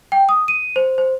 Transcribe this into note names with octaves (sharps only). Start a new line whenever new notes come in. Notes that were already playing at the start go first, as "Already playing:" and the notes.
G5
D#6
D#7
C5
C5